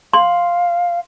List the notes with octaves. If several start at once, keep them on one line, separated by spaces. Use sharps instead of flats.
F5 C6